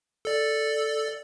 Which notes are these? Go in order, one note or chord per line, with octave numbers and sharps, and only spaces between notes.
A4 D5